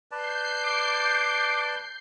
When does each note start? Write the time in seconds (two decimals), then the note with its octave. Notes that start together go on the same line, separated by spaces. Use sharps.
0.11 B4 D5 A5 G6 C7
0.64 D6